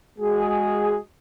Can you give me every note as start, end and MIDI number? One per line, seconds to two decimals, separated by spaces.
0.19 0.97 56
0.19 0.97 66
0.19 0.97 68